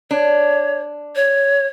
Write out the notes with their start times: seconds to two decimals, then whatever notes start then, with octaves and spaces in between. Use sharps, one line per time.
0.11 D4 C#5
1.16 C#5